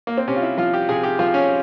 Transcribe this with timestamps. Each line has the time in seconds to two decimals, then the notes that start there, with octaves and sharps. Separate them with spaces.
0.07 A#3
0.18 C4
0.28 C3 C#4
0.36 F4
0.43 E4
0.57 F3 F4
0.74 G4
0.89 C3 G#4
1.03 G4
1.19 F3 F4
1.34 C#4